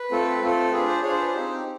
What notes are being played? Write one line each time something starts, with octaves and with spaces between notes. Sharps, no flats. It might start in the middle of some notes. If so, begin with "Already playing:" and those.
Already playing: B4
A3 C4 F4 A4
A3 C4 F4 A4
D4 F4 G#4 B4
C5
D4 F4 G#4 C#5
C5
B4
C5
C4 D#4 G4